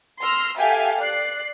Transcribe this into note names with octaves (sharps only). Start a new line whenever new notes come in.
C6 E6 F6 A#6
G4 A4 E5 F5 G5 G#5
D5 F#6 C7